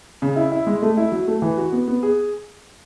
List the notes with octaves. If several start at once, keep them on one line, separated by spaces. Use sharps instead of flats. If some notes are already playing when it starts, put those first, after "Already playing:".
C#3
E4
E4
G#3
A3
E4
F#3
A3
E3
F#4
B3
B3
G#4